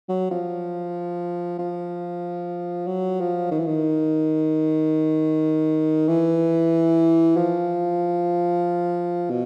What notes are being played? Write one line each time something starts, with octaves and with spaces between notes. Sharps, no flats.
F#3
F3
F3
F#3
F3
D#3
E3
D#3
E3
F3
B2